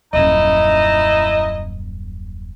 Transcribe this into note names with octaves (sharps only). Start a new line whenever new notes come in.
D#1 F#2 D#4 E4 D#5